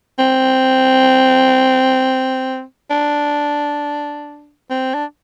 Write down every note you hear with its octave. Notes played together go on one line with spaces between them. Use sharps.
C4
D4
C4
D4